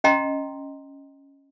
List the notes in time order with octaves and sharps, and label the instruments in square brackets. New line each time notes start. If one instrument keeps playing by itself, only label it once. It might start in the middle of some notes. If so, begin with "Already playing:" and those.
[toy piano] C#4 D#5 G5 A#5 C6